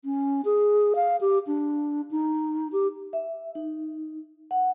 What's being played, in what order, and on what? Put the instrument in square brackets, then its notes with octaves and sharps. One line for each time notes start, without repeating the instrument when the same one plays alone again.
[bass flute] C#4
G#4
F5
G4
D4
D#4
G4
[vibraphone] E5
D#4
F#5